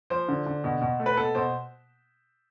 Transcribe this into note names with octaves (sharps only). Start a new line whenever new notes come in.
F3 C5
D3
D3
B2
B2
A3
B4
B2 A4
B2 C5